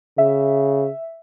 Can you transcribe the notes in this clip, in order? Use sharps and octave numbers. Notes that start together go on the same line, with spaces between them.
C#3 E5